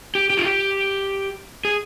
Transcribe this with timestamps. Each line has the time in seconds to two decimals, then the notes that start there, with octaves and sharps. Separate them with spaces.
0.15 G4
0.30 G4
0.37 F4
0.45 G4
1.65 G#4